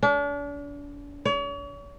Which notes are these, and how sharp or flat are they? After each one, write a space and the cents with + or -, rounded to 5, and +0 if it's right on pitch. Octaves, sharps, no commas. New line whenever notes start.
D4 -40
C#5 +40